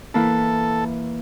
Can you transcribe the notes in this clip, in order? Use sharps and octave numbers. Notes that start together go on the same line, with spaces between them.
E3 A#3 E4 A4